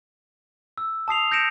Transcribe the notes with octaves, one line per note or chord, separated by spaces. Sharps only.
E6
A5 D#6 C7 F7
G6 A#6 C#7 D7 E7